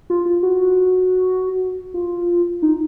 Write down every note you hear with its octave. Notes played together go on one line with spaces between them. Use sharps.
F4
F4
F#4
F4
D#4